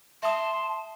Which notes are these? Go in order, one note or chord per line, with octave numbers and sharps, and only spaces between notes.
E5 A5 C6 D#6